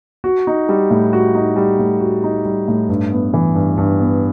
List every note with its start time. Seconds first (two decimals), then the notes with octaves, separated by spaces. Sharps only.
0.24 F#4
0.47 D#4
0.69 G3
0.90 A2
1.13 F#4
1.35 D#4
1.56 G3
1.79 A2
2.00 F#4
2.24 D#4
2.45 G3
2.68 A2
2.89 G2
3.12 B3
3.34 E3
3.55 G2
3.77 G2
4.00 B3